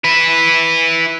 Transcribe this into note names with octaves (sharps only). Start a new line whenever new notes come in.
E4 B4